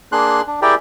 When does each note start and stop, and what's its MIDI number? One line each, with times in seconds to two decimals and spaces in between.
0.12 0.41 58
0.12 0.41 62
0.12 0.41 68
0.12 0.41 84
0.12 0.41 90
0.47 0.60 62
0.62 0.75 64
0.62 0.75 67
0.62 0.75 68
0.62 0.75 70
0.62 0.75 74
0.62 0.75 79